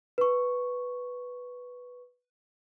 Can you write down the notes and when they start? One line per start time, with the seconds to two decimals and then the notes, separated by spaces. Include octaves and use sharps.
0.18 B4 C#6